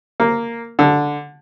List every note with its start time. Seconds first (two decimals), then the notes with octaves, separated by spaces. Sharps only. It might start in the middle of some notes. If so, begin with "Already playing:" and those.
0.20 A#3
0.79 D3